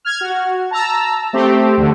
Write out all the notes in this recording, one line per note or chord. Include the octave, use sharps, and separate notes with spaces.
F6 G#6
F#4
A5 A#5 E6
A3 C4 G4
D2 D3 A3